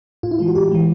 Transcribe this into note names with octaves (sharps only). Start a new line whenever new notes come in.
A2 F4
E4
E3 G#3 F4
F#4
A2 G4
E3 G#3